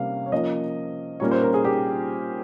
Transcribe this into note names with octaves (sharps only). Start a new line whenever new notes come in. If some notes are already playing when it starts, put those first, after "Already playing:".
Already playing: C3 G3 A#3 C#4 F5
C#5
F3 A#3 C#4 D#5
A#2 G3 A#3 C#4 C#5
C5
A#4
G#4
G4